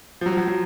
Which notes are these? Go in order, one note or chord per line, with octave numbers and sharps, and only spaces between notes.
F3
F#3
F3
F#3
F#3